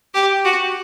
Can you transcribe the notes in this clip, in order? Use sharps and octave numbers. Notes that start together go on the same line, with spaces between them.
G4
F#4